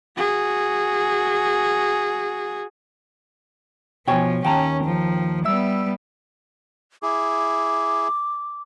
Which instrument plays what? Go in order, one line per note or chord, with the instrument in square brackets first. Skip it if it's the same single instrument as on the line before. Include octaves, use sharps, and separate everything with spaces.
[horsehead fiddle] F#4 G#4
[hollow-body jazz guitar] B2 C#5 [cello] F3 [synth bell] G5 G#5
[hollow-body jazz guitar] D#2 [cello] C#4 [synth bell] G5 A5 A#5
[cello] F3
[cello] G3 B3 [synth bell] E5 E6
[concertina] E4 G#4 [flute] D6